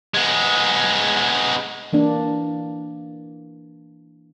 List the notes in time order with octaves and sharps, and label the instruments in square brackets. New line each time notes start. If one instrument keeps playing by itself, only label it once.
[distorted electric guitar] G#3 B3
[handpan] E3 A#3 D4